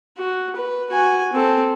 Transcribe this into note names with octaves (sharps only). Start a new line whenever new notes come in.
F#4
B4
F#4 G#5
C4 A4